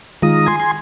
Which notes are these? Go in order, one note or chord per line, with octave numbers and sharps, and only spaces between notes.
D#3 G#3 F4 A#5 D#6
G#5 C6
C6